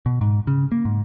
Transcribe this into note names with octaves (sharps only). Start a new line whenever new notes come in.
B2
G#2
C#3
A#3
G#2